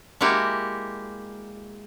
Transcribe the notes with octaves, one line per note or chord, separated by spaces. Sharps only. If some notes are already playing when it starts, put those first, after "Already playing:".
G#3 A#3 E4 F#4 G4